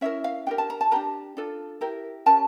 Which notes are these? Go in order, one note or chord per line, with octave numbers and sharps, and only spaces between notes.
C#4 E4 A#4 E5
F5
D4 G4 A#4 G5
A5
A#5
A5
D4 G4 A#4 A#5
D4 F4 A4
E4 G4 A#4
C#4 G4 A#4 A5